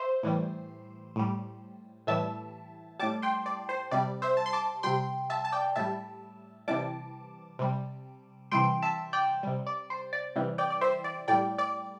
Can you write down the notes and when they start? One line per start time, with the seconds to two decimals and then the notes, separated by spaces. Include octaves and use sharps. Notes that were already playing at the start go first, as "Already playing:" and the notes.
Already playing: C5 E5
0.23 A2 E3 G3
1.16 A2 G3
2.07 A2 E3 G3 E5 A5
2.99 A2 G3 A5 D6
3.22 G5 C6
3.46 D5
3.69 C5
3.91 C3 G3 D5
4.22 C5 E5
4.37 A5
4.46 C6
4.53 A5 D6
4.83 C3 G3 G5 C6
5.30 E5 A5
5.45 A5
5.52 D5 G5
5.75 A2 G3 E5 A5
6.68 C3 E3 G3 A5 D6
7.59 C3 G3
8.51 C3 E3 G3 G5 C6
8.82 E5 A5
9.13 D5 G5
9.43 C3 G3
9.67 D5
9.90 C5
10.13 D5
10.36 C3 E3 G3
10.58 D5 G5
10.70 D5
10.81 C5 E5
11.04 D5
11.28 A2 G3 D5 G5
11.58 D5